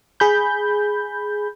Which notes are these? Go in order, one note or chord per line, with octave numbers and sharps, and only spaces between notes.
G#4 B5 G6